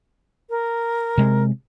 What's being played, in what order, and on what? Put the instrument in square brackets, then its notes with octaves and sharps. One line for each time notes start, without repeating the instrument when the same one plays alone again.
[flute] A#4
[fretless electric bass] C3 G#3